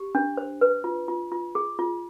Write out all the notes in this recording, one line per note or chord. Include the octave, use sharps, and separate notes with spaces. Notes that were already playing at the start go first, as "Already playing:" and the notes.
Already playing: G4
D4
C5
B4
F4
F4
F4
G#4
F4